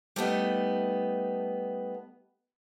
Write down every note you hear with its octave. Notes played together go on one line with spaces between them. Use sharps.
G3 A3 B3 D#4